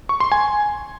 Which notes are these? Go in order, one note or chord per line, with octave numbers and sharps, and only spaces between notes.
C#6
C6
G#5